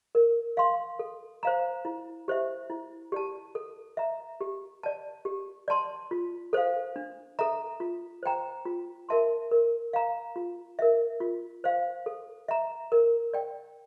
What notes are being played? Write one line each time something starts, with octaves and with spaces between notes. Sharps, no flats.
A#4
F5 C6
A4
C5 F5 A#5
E4
G4 C5 E5
E4
G4 D5 A5
A4
E5 A#5
G4
D5 A5
G4
D5 A5 C6
F4
A4 C5 F5
D4
A4 E5 A#5
F4
C5 G5 A#5
F4
A#4 E5 A5 C6
A#4
F5 A#5
F4
A#4 E5
F4
C5 F5
A4
E5 A#5
A#4
D5 G5